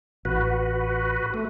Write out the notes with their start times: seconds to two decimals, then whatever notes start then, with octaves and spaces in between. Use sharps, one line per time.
0.25 A1 F#4 B4
1.34 A3